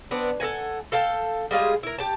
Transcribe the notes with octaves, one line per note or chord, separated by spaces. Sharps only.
B3 C4 D4
A4 A#4 F#5 G#5
A4 F5 G5 A5
G3 G#3 F4 G#4
E4 A#4
G4 A5